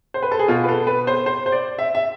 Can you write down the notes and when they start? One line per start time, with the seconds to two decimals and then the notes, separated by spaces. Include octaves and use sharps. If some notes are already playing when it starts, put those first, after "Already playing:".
0.14 C5
0.22 B4
0.31 A4
0.39 G#4
0.48 B2 F4
0.64 B4
0.68 A4
0.87 B4
1.07 C5
1.26 C5
1.46 C5
1.52 D5
1.79 E5
1.95 E5